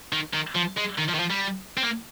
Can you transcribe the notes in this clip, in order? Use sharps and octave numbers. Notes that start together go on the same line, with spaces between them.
D#3
D#3
F3
G#3
D#3
F3
D#3
F3
G3
C4
A#3